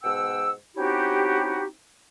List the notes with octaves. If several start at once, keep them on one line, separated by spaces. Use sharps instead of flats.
G#2 B2 F#5 G5 E6
C4 C#4 D#4 E4 F#4 G4